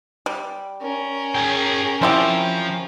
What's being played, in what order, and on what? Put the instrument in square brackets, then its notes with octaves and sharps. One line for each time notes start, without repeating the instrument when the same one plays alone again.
[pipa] G3
[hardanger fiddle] C#4 A#4
[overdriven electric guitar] G#4 G5
[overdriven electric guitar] F3 [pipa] C4 E4 G4